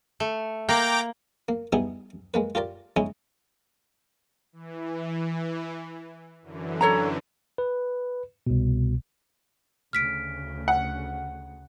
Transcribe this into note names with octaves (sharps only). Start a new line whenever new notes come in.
A3
A#3 G5 A#5 D6
A#3
G3 B3 D#4 E4 G#4
G#3 A#3 B4
F4 G4 A#4 D5
G#3 C#4 D#4 E4
E3
F#2 D3 E3
A4 C#5 A#5
B4
C2 B2
D2 C#3 F6 B6 D7
F#5